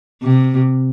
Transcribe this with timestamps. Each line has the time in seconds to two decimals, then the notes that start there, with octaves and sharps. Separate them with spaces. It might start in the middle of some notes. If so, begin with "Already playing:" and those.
0.22 C3